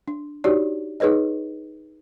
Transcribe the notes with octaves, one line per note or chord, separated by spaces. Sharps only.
D4
D4 D#4 F#4 G4 C#5 D5
D#4 G#4 B4 C#5 D#5